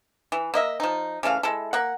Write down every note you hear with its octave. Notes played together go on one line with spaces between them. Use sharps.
E3
A#3 D#5 E5
F3 D#4
C#3 E3 A3 F5
G#3 E4 A4
A#3 F#5